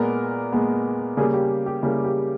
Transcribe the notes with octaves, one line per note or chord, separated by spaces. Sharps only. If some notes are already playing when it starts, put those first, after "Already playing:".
Already playing: A#2 G#3 B3 A#4
A#2 G#3 B3
C#3 G3 A#3 G#4
G4
G4
C#3 G3 A#3 E4
G4